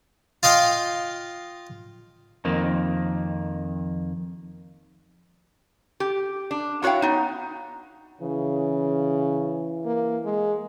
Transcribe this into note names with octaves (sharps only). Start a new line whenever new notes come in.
F4 D#5 F5 G5
F2 D#3 A#3
G4
D4
E4 F#4 C#5 F5 G5
B3 D#4
C#3 E3
A#3
G#3